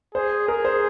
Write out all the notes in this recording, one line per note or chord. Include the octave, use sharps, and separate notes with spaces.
G#4 C5
G#4 A#4
C5